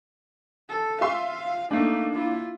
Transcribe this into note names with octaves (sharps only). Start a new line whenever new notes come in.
A4
F4 E5 F5 C6
A3 A#3 D4 D#4
E4 F4